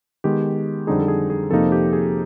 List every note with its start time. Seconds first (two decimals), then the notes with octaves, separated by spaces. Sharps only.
0.24 D#3 G#3 B3 G4
0.87 F2 D3 G3 C4 D#4 G#4
0.99 A4
1.08 G#4
1.30 G#4
1.51 F2 C3 F3 A#3 D#4 A4
1.72 G4
1.93 G#4